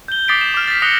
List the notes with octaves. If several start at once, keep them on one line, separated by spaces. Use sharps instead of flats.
G6 G7
D6 D#6 A6 B6 C7 D7
E7
D6 F6
A6 B6
D#6 F#6 A#6 C#7 F7 G7